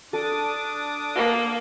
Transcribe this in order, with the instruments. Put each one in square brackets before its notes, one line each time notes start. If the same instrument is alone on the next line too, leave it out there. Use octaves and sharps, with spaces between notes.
[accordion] D4 D6 D#6 [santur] A4
[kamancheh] A#3